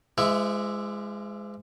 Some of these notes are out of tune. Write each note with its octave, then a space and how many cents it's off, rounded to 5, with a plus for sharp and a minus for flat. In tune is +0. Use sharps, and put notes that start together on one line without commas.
F3 -45 G#3 +0 E5 +0